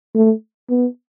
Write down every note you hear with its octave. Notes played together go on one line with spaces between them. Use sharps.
A3
B3